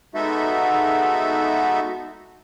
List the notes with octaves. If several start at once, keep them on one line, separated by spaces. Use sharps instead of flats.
G#3 B3 D#4 F#4 A4 E5